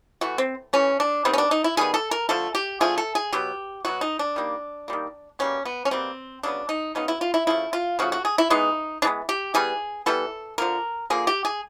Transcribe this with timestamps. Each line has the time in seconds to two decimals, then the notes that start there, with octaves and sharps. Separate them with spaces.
0.21 E3 A3 F#4
0.38 C4
0.73 E3 A3 C#4
1.00 D4
1.25 D#3 G3 B3 C4
1.33 C#4
1.38 D4
1.51 D#4
1.64 E4
1.77 D#3 G3 B3 G#4
1.94 A4
2.11 A#4
2.29 D3 F3 A3 A4
2.55 G4
2.80 D3 F3 A3 G#4
2.98 A4
3.15 G#4
3.32 B2 F#3 B3 G4
3.85 B2 F#3 B3 F#4
4.01 D#4
4.19 D4
4.36 D#3 G3 A#3
4.88 D#3 G3 A#3
5.39 B2 G3 A#3 C#4
5.65 B3
5.85 C#4
5.91 B2 G3 A#3 C4
6.43 C#3 F#3 B3 D4
6.69 D#4
6.95 C#3 F#3 B3 D#4
7.08 E4
7.21 F4
7.34 E4
7.47 C#3 F3 A3 E4
7.73 F4
7.99 C#3 F3 A3 F#4
8.12 F#4
8.25 G#4
8.38 E4
8.50 E3 G#3 B3 D#4
9.02 E3 G#3 B3 D4
9.29 G4
9.54 E3 G3 B3 G#4
10.06 E3 G3 B3 A4
10.58 D3 F3 A#3 A#4
11.10 D3 F3 A#3 G#4
11.27 G4
11.45 G#4